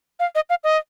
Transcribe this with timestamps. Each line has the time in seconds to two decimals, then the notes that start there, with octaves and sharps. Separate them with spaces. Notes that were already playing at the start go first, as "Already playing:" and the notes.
0.20 F5
0.35 D#5
0.50 F5
0.64 D#5